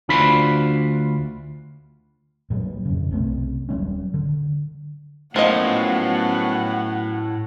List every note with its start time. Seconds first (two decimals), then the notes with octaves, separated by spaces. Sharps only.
0.09 D2 D4 F4 C5 B5
2.50 A#2 F#3 G3
2.85 F2 C#3
3.11 B1 C3 A3 C4
3.69 D#1 F#3 G3 C#4
4.14 D3
5.36 A2 F3 F#3 A#3 B3 C#4 D#5 F#5